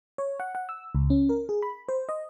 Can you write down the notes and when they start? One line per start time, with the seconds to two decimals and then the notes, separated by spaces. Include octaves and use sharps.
0.18 C#5
0.40 F#5
0.55 F#5
0.69 E6
0.95 C#2
1.10 C#4
1.29 A#4
1.49 G#4
1.62 B5
1.89 C5
2.09 D#5